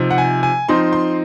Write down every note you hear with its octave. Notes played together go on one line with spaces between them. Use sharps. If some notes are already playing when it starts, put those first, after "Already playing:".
Already playing: C3 F3 C4 D#4
F#5
G#5
G#5
F3 C4 D#4 C6
C6